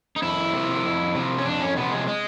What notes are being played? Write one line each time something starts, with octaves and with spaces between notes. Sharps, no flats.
D#4
F2 E4
C3 F3
F2
C3 F3
C#4
F2 D4
C#4
C3 F3 B3
G#3
G#3